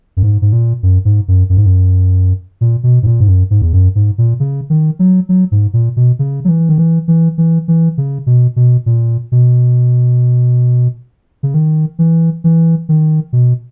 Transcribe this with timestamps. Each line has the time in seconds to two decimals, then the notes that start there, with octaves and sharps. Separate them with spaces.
0.17 F#2
0.23 G#2
0.42 G#2
0.52 A#2
0.83 F#2
1.05 G#2
1.28 F#2
1.50 F#2
1.57 G#2
1.66 F#2
2.61 A#2
2.84 B2
3.03 G#2
3.06 A#2
3.20 G#2
3.28 F#2
3.51 G#2
3.62 E2
3.73 F#2
3.95 G#2
4.18 A#2
4.40 C#3
4.70 D#3
4.99 F#3
5.29 F#3
5.52 G#2
5.73 A#2
5.97 B2
6.19 C#3
6.45 F#3
6.49 E3
6.69 D#3
6.78 E3
7.08 E3
7.38 E3
7.68 E3
7.98 C#3
8.27 B2
8.56 B2
8.86 A#2
9.32 B2
11.43 C#3
11.54 D#3
11.99 E3
12.44 E3
12.89 D#3
13.33 B2